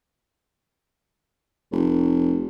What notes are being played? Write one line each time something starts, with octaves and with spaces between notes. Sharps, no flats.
F1